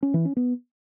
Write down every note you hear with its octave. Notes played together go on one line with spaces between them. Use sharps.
C#4
E3
C#4
B3